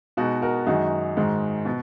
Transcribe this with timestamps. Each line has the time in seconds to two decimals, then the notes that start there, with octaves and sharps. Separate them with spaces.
0.17 B2 G#3 D#4 F#4
0.42 F#4 A#4
0.66 F#2 D#3 G#3 D#4 F#4
1.17 G#2 D#3 G#3
1.65 B2